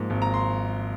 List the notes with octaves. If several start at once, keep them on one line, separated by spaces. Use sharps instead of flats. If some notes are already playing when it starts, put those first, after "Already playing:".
Already playing: G#2 F3 A#3
G#1
A#5
C6